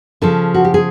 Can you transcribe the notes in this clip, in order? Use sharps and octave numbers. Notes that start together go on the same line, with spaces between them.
C#3 F3 A4
F#4
G4
G#4